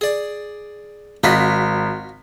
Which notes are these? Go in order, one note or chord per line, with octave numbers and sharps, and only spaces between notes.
G#4 D5
G#1 F4 F#4 D#5 B6